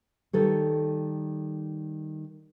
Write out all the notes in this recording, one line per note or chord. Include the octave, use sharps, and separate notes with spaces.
D#3 G3 A4 C#5